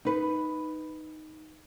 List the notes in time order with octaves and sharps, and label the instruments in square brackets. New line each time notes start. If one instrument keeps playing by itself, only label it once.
[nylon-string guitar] D#4 B4